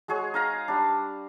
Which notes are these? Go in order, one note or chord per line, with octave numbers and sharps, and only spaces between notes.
G#3 F#4 G#4 C#5
D#4 F5 A#5
G3 D4